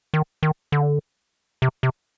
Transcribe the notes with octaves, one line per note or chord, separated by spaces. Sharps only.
D#3
D#3
D3
C3
C3